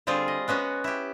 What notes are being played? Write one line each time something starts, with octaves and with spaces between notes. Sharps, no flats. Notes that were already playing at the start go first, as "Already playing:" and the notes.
D3 G3 C4 F4 G#4
D#5
G#3 B3 C#4 F#4
E4 G4